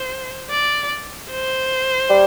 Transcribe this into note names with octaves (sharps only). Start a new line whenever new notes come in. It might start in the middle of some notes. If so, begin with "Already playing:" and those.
Already playing: C5
D5
C5
G3